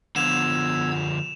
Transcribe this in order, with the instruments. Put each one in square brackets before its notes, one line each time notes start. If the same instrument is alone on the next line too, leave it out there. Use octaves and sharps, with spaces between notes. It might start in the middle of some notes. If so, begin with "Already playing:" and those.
[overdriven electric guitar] D3 F3 [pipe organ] B3 E6 G#6 [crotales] E7 F7